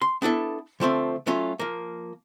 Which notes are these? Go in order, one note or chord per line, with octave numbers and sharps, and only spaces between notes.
C6
B3 D4 E4 A4
D3 F3 A3 C4
F#3 A3 C#4 F4
F3 A#3